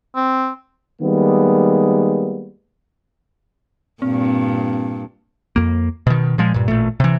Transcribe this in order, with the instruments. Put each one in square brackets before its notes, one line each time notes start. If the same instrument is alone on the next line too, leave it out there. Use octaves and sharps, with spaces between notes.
[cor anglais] C4
[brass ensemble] D#3 G3 G#3 A#3 B3
[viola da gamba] G2 A#2 [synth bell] C4
[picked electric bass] F2 A#3
B2 D#3
A#2 F3 G#3
G2 A#2
A1 A#2 A3
C3 E3